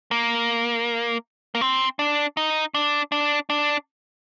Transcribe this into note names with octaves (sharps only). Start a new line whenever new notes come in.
A#3
A#3
C4
D4
D#4
D4
D4
D4